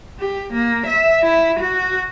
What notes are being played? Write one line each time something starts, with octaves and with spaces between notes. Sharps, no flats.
G4
A#3
E5
E4
F#4